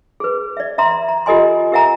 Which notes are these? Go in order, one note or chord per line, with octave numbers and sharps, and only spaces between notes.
G#4 B4
D5 E5
E5 A#5 C6
A#5
F4 G4 A4 D#5 G#5 C6
G4 A#4 E5 F#5 G#5 A#5